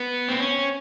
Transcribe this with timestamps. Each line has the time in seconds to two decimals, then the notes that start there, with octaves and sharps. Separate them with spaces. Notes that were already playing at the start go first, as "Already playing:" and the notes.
Already playing: B3
0.29 C4
0.40 C#4